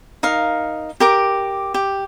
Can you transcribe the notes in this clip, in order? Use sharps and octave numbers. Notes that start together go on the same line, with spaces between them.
D#4 A#4 F5
G4 A#4 D6
G4